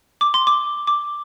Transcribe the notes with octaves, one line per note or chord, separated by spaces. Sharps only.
D6
C6
D6
D6